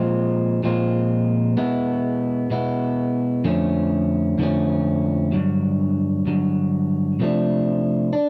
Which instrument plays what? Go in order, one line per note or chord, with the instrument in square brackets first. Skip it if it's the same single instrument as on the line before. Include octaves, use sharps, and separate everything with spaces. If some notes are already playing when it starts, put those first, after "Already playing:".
Already playing: [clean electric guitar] A#2 F3 G#3 C4 F4
A#2 F3 G#3 C4 F4
B2 G#3 B3 E4
B2 G#3 B3 E4
F2 D3 F3 A3 C#4
F2 D3 F3 A3 C#4
G2 D3 F#3
G2 D3 F#3
C3 F3 A3 D4
D4